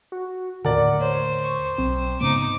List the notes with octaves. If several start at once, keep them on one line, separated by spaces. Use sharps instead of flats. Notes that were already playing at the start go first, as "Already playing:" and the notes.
F#4
D#2 A2 D3 A#4 D5 F#5
C5 C#5
C#6
B1 C4
G#2 C#3 B3 D#4 D6